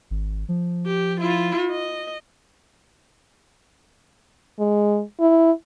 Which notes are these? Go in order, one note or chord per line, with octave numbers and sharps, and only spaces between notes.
G#1
F3
G4
E4 F4
D#5
G#3
E4